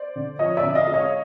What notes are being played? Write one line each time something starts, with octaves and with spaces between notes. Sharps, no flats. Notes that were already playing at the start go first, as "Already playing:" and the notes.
Already playing: C5 D5
D3
F3 C#5 D#5
D5 E5
D3
D#5 F5
G#3
C#5 D#5